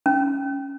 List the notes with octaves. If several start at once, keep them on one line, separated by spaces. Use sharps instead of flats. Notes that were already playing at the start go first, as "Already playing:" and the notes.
C#4